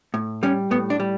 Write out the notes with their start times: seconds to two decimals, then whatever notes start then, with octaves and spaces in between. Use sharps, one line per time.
0.14 A2
0.43 G3 C#4
0.71 A2 B3
0.90 D4
1.00 G3